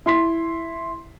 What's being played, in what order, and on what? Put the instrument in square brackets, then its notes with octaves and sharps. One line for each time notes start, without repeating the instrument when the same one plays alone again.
[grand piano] E4 C6 B6